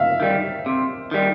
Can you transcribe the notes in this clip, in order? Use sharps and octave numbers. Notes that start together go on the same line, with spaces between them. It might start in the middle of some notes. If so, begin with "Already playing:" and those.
Already playing: E5 F5
D#3 G3
C3
D#3 G3